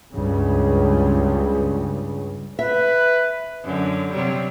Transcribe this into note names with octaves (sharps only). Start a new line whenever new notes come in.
C#2 G2 C#3
B4 E5
F#2 D3
C3 F#3 G3